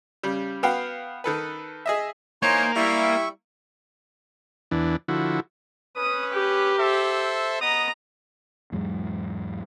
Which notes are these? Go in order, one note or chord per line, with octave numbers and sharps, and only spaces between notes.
C#3 G3
B3 F#4 F5 G5
D#3 A4 B4
G#4 D#5 E5
E3 A#3 D#4 C5 C#5 G#5 C6
G3 E4 E5 C#6
E2 E3 D4
D3 F3 E4 F#4
C#4 B4 D#6
G4
A4 C5 E5
B3 D#5 A#5 D#6
E2 G#2 F#3 G#3